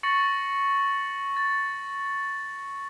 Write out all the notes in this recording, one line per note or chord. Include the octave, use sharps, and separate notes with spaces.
C#6 A6 A#6 C#7 F#7
A6